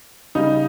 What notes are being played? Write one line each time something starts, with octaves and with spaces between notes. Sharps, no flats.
C#3 G3 D#4